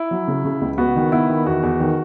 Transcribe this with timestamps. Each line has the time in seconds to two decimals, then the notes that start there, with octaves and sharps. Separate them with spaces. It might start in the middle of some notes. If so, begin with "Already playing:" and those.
Already playing: E4
0.11 F#3
0.28 C#3
0.45 C#3
0.61 C#2
0.78 B3 F#4
0.96 D#3
1.12 B3 E4
1.29 D#3
1.46 E2 F#4
1.63 E2
1.80 D#3